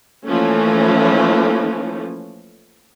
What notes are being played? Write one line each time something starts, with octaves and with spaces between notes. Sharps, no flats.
E3 F3 A3 A#3 C#4